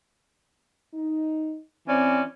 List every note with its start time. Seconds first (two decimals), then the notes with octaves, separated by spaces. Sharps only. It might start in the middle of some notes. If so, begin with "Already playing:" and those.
0.94 D#4
1.87 E3 C4 C#4 D5